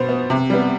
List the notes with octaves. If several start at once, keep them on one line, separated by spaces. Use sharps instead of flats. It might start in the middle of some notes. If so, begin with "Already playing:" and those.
Already playing: B2 B4 C5
B3
C3
G3 B3